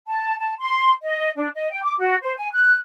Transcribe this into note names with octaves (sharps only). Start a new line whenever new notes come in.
A5
A5
C6
D#5
D4
D#5
G5
D6
F#4
C5
G#5
F#6